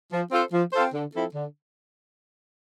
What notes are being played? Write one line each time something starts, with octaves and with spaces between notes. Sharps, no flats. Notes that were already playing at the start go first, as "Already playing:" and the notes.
F3
C4 F4 A4 C5
F3
C4 F4 A4 C5
D3
F3 C4 E4 A4
D3